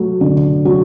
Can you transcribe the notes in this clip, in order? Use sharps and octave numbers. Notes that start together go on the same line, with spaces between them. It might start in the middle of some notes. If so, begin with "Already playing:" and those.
Already playing: F#3 A3
D3
F#3